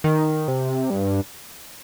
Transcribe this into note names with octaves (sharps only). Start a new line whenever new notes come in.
D#3
C3
G2